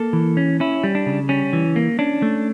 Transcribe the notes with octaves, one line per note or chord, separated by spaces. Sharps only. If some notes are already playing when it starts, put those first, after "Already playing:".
Already playing: A#3 A4
E3
C#4
C#4 E4
G3
D4
C#3
G3 C#4
E3
A#3
C#4 D4
A3